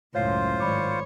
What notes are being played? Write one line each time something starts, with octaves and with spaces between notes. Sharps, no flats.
C#2 F#2 A2 F4 C5 C#5 F5 C7
G#1 C#5 D5 B5 D6